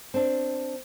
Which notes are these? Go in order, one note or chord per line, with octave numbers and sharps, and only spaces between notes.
C4 D4